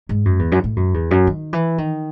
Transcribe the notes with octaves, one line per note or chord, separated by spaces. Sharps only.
G#2
F#2
E2
F#2
A2
F#2
E2
F#2
D#3
E3
D#3